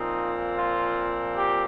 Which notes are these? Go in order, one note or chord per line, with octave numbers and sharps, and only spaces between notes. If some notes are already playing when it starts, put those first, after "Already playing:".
Already playing: A#2 F3 C4 D#4
F4
G4